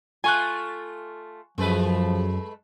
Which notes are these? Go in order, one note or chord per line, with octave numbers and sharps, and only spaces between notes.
A3 F4 G#5 C#6 F#6
F#2 F3 G#3 A3 B4